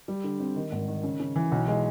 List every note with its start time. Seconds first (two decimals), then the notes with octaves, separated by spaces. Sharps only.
0.08 G3
0.24 D3
0.40 C4
0.56 D#3
0.72 G#1
0.88 D#3
1.03 C#3
1.20 C#3
1.36 E3
1.51 B1
1.68 G#3